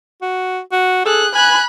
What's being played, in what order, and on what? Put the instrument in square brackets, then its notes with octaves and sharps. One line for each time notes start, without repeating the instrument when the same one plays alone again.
[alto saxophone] F#4
F#4
[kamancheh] G#4 F#6 [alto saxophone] A4
[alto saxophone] G#5 [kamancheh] B5 F#6